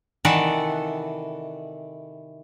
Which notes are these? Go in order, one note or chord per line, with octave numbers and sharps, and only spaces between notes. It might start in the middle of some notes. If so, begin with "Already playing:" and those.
C3 D#3 E3 A4 D5 F#5